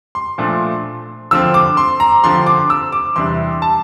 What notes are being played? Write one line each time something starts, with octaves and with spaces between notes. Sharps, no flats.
C6
A#2 F3 A3 D4
D3 F3 C4 E6
D6
C6
A#5
D3 F3 C4 C6
D6
E6
D6
E2 C3 G3 D4 C6
A5